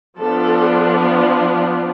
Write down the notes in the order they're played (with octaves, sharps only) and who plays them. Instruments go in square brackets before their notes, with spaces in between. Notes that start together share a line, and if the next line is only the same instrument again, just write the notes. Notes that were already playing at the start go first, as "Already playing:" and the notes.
[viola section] F3 B3 D4 A4